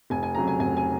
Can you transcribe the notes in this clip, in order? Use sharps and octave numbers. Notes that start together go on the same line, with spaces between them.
F1 G#5
G#5
F2 C#3 F#3 A#5
G#5
F1 G#5
G#5